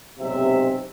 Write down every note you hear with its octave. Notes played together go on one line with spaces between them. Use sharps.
B1 G#2 C3 E5